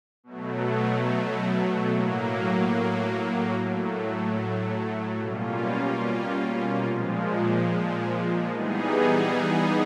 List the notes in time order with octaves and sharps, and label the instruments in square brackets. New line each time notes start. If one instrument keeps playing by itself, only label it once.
[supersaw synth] B2 F#3 A3
A2 F#3 A#3
A2 F#3 A3
B2 G3 A#3 C#4 F4
A#2 F3 G#3
E3 G3 B3 D#4 G#4